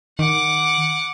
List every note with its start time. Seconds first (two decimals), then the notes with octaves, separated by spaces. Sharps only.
0.19 D#3 F#5 D6